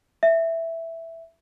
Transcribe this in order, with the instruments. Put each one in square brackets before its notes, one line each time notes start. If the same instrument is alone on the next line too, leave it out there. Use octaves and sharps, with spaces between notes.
[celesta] E5